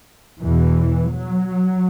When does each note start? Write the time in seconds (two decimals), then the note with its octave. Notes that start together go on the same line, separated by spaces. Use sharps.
0.41 E2 B2 E3
1.11 F#3